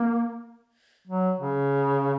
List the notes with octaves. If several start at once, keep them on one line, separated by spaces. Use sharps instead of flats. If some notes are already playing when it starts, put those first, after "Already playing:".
Already playing: A#3
F#3
C#3